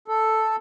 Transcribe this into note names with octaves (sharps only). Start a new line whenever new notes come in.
A4